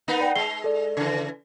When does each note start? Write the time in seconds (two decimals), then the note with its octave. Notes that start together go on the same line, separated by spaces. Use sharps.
0.08 A#3 B3 D#4
0.20 D5 F#5 G5
0.36 G#3 C7 G7
0.64 A4 D5
0.97 C#3 E3